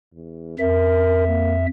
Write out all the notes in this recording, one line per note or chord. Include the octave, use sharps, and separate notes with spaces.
E2
F2 A#4 E5
A#3